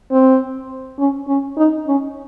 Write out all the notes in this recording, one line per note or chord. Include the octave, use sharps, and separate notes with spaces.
C4
C#4
C#4
D#4
C#4